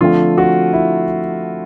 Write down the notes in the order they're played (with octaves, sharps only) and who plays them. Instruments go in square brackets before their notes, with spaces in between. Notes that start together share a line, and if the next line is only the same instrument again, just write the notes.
[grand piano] D3 F3 A3 C4 F4
F#4
E4